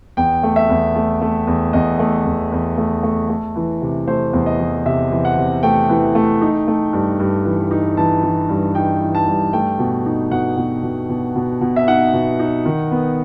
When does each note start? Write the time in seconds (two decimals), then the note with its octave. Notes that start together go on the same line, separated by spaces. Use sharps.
0.17 E2 G5
0.43 A3
0.56 E5
0.69 E2
0.95 A3
1.21 A3
1.47 E2
1.73 E2 D#5
1.99 A3
2.25 E2
2.52 E2
2.77 A3
3.03 A3
3.29 A3
3.56 E3
3.82 C3
4.07 A3 C5
4.33 E2
4.46 D#5
4.59 E3
4.86 C3 E5
5.11 E3
5.25 F#5
5.37 C3
5.63 A3 G5
5.89 E3
6.15 A3
6.41 D#4
6.68 A3
6.93 G2
7.20 G2
7.45 E3
7.71 D#4
7.97 E3 A5
8.23 E3
8.49 G2
8.75 D#4 G5
9.01 E3
9.15 A5
9.27 G2
9.53 A3 G5
9.79 B2
10.06 D#4
10.31 B2 F#5
10.57 B2
10.83 B2
11.09 B2
11.36 B2
11.61 B2
11.76 E5
11.87 D#4 F#5
12.14 B2
12.39 D#4
12.65 D#3
12.91 B3